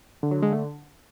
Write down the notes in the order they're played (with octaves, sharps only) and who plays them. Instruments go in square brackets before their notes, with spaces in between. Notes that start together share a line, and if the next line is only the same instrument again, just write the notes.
[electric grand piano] D3
[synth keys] F#3
G#3
A3